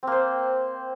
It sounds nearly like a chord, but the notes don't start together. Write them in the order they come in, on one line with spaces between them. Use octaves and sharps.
C4 A#3 C5